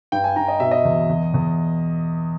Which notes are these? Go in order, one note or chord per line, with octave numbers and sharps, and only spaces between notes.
G2 G5
G#5
G2 A#5
D#5
B2 E5
D#5
E2
E2
E2